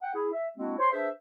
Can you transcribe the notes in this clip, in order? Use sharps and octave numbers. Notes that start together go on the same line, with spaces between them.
F#5 G5
E4 G#4
E5
G#3 A#3 C4 D4 E4 F#4
C5 C#5 C6
D4 G#4 B4 C5 E5